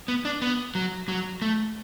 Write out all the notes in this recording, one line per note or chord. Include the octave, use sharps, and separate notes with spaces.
B3
D4
B3
F#3
F#3
A3